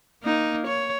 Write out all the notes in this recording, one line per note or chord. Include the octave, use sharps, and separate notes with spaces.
A#3 D#4
C#5